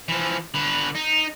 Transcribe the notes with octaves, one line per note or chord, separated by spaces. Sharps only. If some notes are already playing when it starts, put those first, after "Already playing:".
E3 F3
D3 B4
D#4